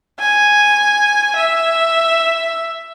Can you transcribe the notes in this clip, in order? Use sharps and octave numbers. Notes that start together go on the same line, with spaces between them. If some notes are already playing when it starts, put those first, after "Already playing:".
G#5
E5